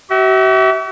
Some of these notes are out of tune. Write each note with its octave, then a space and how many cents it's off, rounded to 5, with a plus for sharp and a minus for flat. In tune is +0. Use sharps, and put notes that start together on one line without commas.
F#4 +45 E5 -25